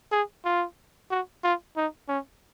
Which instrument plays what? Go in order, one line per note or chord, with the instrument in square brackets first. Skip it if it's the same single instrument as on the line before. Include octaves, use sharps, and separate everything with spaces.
[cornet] G#4
F4
F#4
F4
D#4
C#4